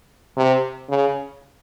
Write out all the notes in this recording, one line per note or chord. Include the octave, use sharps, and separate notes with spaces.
C3
C#3